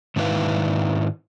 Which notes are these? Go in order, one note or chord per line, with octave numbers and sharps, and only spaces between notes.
G#2 D#3 D4 E4 B4 F5